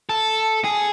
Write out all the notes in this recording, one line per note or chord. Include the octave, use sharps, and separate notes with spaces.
A4
G#4